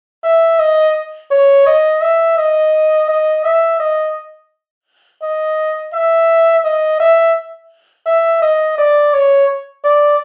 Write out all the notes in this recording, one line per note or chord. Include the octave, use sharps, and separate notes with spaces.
E5
D#5
C#5
D#5
E5
D#5
D#5
E5
D#5
D#5
E5
D#5
E5
E5
D#5
D5
C#5
D5